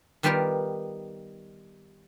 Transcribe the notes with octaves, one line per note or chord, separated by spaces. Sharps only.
D#3 G3 B3 F4 G4 A#4